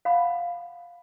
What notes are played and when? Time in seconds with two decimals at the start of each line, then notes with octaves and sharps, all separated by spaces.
0.05 F5 F#5 B5